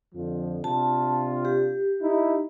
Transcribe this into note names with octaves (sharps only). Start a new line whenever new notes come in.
F2 D3 F3
C3 D4 F4 A5
G4
D#4 E4